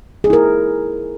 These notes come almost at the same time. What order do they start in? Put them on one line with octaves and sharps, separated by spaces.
G#4 D#4 E4 A#4